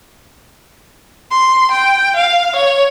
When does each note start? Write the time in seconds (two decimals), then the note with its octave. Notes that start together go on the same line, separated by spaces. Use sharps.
1.32 C6
1.72 G5
2.17 F5
2.56 C#5